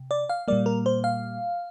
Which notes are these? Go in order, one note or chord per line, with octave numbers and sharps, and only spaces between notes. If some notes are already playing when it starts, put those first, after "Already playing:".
Already playing: C3
D5
F5
A#2 G3 A#3 D5
A#4
C5
F5